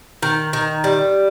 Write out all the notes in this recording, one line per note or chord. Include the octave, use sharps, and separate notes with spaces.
D#3
D#3
G3